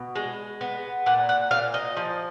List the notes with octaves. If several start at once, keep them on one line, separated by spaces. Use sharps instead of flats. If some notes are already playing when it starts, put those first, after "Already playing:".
Already playing: B2
G#3
B3
A#2 F#5
F#5
A#2 F5
D#5
F3